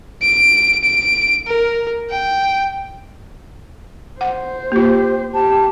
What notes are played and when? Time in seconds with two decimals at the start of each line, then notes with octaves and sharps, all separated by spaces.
0.23 D7
0.84 D7
1.47 A#4
2.10 G5
4.21 C5 F#5
4.72 A#3 F4 G4
5.33 G4 A5